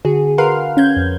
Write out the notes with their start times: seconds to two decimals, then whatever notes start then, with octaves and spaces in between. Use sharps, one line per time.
0.05 D3 F#4 G#4
0.38 A#4 B4 F5 F#5 C6 F6
0.77 C#4 G6 G#6
0.97 F2